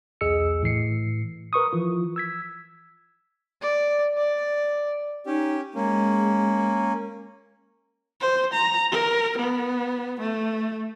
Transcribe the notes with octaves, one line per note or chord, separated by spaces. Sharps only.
B1 E2 G#4 D#5 E6 C#7
A2 E3 C7 C#7
A#4 B4 C#6 D#6
E3 F3 F4
E6 G#6 B6
D5
D5
C#4 D#4 G4
G#3 A#3 C#4
C5
A#5
A#4
B3
A3